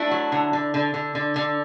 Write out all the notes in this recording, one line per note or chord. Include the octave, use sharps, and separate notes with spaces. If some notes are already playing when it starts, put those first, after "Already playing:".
Already playing: A3 D4 E4
F#3
D3
D3
D3
D3
D3
D3